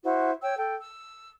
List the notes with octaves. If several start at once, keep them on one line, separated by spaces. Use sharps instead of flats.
E4 F#4 C5
C#5 G5 E6
A4 G5
E6